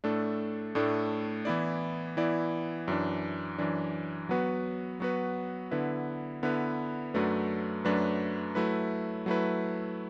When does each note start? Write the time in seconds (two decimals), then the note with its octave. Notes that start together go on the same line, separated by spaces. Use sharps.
0.04 A2 A3 D4 A4
0.75 A2 A3 D4 A4
1.45 E3 B3 E4 D5
2.17 E3 B3 E4 D5
2.88 F#2 E3 D4
3.58 F#2 E3 D4
4.29 F#3 B3 F#4 B4
5.00 F#3 B3 F#4 B4
5.71 D3 B3 E4 B4
6.43 D3 B3 E4 B4
7.14 F#2 F#3 A3 D4 B4
7.85 F#2 F#3 A3 D4 B4
8.55 F#3 A3 E4 B4
9.26 F#3 A3 E4 B4